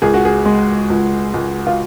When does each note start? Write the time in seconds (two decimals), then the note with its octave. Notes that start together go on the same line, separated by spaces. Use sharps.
0.02 C#2 G#4
0.14 F#4
0.25 G#4
0.45 G#3
0.90 C#2
1.34 C#2
1.67 F4